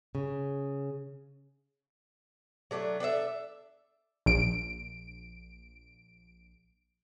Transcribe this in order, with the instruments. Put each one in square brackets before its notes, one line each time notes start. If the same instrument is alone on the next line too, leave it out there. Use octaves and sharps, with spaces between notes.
[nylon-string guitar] C#3
[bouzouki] F#3 A3 D4
D4 A4 D5 E5
[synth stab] A#1 D7